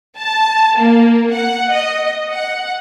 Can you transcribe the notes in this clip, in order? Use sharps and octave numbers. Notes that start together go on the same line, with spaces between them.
A5
A#3
F#5
D#5
F#5